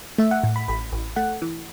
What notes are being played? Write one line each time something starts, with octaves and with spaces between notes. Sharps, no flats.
A3 E5
F#5
A2
B5
A1 B5
A1
A3 F#5
E3